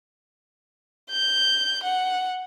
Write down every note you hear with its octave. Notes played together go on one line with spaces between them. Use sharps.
G6
F#5